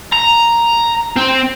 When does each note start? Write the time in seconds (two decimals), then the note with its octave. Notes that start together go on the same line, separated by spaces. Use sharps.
0.12 A#5
1.16 C4